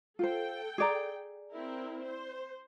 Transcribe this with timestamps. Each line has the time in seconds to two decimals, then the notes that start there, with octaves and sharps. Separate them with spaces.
0.19 F4 A4 C5 G5
0.78 G#4 D5 A#5
1.51 C4 E4 A#4
2.04 C5